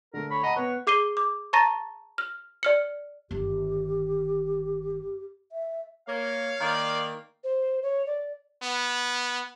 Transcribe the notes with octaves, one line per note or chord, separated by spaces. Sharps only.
D3 A3 A#4
C#5 B5
D#5 F#5 A5 A#5
B3 B4 C#5 F#5
G#4 D6 C7 D#7 G7
D6
A5 A#5 C#6 A6 A#6 D#7
F6
D5 F6 C#7
G1 D#3 G4
E5
A#3 C#5 F5
D#3 A#3 D5
C5
C#5
D5
B3